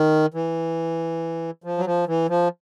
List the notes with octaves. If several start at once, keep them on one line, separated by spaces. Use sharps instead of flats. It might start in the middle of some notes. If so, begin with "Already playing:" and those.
Already playing: D#3
E3
F3
F#3
F3
E3
F3